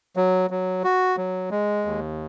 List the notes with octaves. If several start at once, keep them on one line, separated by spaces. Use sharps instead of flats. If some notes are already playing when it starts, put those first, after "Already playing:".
F#3
F#3
F#4
F#3
G#3
D#2